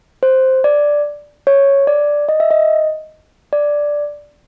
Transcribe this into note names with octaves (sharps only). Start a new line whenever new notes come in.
C5
D5
C#5
D5
D#5
E5
D#5
D5